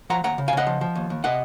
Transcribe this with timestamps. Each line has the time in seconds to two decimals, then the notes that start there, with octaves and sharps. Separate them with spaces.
0.10 F3 F#5 A#5
0.24 D#2 F#5 A#5
0.38 C#3
0.48 F5 G#5
0.53 C#3 D#5 F#5
0.67 F3
0.81 F3
0.95 D#2
1.10 D#2
1.24 C3 D#5 F#5